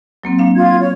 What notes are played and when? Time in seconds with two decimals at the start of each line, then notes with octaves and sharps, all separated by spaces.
0.24 F#3 A#3 C4
0.39 A#3 D4 F5
0.55 F4 G#6
0.80 C#5